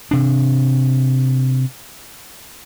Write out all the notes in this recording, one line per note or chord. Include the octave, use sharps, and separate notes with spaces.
C3 D4